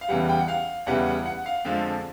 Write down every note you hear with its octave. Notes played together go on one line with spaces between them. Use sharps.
F5
E2 C#3 E3 G3 F#5
G5
F#5
F5
E2 C#3 E3 G3 F#5
F#5
F#5
F5
F2 D3 F3 G#3 F5